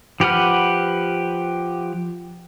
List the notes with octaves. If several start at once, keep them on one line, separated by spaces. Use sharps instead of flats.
F3 G4 B4 F#5 F6